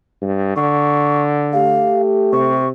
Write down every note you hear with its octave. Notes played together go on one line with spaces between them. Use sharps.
G2
D3 C#6
A3 G4 F5
C3 C#6